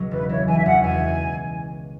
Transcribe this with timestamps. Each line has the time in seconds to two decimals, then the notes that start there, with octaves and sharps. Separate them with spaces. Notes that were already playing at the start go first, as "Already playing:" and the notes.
Already playing: C#2 B2 F#3
0.11 E1 B4
0.29 E3 C#5
0.47 E3 G#5
0.57 E5
0.65 E1 F#5
0.84 E2 G#5